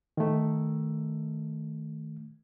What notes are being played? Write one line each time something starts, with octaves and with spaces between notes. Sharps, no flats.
D#3 A3